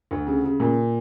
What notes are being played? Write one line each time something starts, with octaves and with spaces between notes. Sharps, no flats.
D2
C#3
C#3
A#2